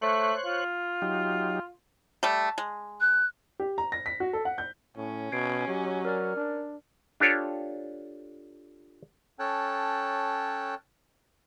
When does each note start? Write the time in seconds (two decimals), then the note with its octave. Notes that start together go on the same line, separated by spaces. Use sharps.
0.02 A3 C5 C#5 F#6
0.46 F4
1.02 F#3 D#4 G4
2.23 G3 A3
2.58 G#3
3.00 F#6
3.60 G4
3.78 A#5
3.92 A#6
4.06 B6
4.20 F#4
4.33 A4
4.45 F#5
4.58 G6
4.97 A2 C#4
5.32 B2 G#6 C7 D7
5.68 F#3 G4 D#5
6.05 A#4 D5 F6
6.37 D4
7.20 D4 F4 G4 A4 C#5
9.39 C#4 A4 C#5 G5 A5 F#6